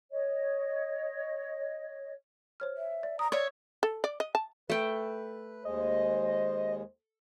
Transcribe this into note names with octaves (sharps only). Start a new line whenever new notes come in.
C#5 D#5
C5 C#5 F6
E5
D5
A#5 D#6
C#5 D5 E5
A4
D5
D#5
A5
A3 B4 G5
D#2 G#3 C5 D#5